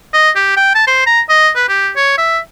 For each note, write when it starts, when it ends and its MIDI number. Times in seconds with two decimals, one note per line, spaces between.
0.14 0.31 75
0.36 0.54 67
0.57 0.72 79
0.75 0.84 81
0.87 1.02 72
1.06 1.21 82
1.29 1.50 75
1.56 1.64 71
1.69 1.90 67
1.96 2.14 73
2.18 2.39 76